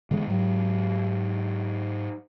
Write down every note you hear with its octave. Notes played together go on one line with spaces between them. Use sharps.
D3 E3 G#3 B3
G#2 F#3